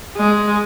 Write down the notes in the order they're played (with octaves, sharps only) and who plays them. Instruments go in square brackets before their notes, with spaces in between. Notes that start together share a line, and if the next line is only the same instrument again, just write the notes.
[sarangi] G#3